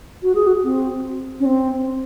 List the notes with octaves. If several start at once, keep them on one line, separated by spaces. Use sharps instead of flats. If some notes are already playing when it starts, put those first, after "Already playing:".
F#4
G#4
F#4
C4
C#4
C4